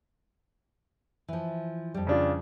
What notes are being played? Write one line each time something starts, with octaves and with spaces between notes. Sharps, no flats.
E3 F3
F2 G3
C#3 D4 F4